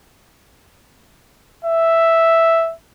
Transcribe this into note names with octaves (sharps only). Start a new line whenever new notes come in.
E5